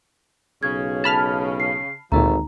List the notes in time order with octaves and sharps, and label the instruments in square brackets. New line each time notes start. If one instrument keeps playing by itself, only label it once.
[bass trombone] B1 [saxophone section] C#3 [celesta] G#6
[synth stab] A5 B5 F6
[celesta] C7
[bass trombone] G#1 [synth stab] D2 A#2 [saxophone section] E3 F3 A3 [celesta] D#4 A#5